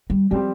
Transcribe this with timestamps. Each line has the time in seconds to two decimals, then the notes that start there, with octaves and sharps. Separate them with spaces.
0.10 G3
0.31 F3 G3 C4 G4